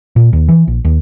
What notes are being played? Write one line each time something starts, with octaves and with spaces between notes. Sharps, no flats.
A#2
D#2
E3
A#1
D#2